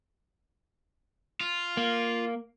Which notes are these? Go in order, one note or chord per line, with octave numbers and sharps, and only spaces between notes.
F4
A#3